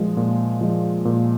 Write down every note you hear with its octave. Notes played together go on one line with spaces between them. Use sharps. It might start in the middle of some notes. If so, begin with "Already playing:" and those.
Already playing: A#2 F3 G#3
A#2
F3 G#3
A#2